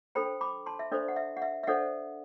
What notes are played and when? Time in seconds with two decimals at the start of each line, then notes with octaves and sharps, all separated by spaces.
0.15 D4 A4 C5 G5 B5
0.41 B5 D6
0.66 A5 C6
0.79 E5
0.92 D4 A4 C5 D5
1.08 F#5
1.16 E5
1.37 F#5
1.42 E5
1.63 E5
1.67 D4 A4 C5 D5 F#5